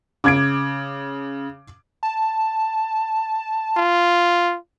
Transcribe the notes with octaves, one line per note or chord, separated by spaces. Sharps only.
C#3 D6 G#6 D7
A5
F4